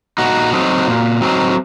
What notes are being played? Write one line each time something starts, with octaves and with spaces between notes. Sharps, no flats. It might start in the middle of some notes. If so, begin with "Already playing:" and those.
A#2 D#4 F#4
F#3 C4 D#4
A#2
F#3 C4 D#4